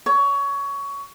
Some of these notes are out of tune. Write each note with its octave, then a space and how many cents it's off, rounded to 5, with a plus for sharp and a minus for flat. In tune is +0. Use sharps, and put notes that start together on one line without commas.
C#5 +20